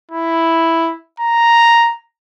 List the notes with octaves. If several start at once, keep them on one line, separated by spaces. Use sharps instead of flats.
E4
A#5